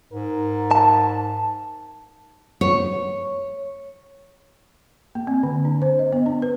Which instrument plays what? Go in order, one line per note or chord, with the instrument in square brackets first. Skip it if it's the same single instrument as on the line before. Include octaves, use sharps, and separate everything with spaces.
[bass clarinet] G#2 [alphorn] A#4
[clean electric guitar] A5
[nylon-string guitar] C#5
[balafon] A#3
C4
D3
D4
C5
D#5
B3
D4
B4